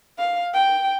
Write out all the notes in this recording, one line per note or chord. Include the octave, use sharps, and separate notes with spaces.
F5
G5